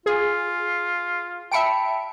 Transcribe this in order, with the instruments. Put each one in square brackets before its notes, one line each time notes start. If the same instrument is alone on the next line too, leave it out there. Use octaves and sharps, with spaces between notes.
[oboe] F4 [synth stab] G#4
[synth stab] E5 C#7 D7 [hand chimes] G5 A5 B5